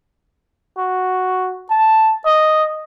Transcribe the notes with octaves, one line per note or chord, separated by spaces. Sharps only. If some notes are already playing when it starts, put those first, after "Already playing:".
F#4
A5
D#5